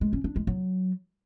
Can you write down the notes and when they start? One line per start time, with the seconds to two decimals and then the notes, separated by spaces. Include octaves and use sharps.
0.01 G#3
0.13 C#4
0.24 D4
0.36 G#3
0.47 F#3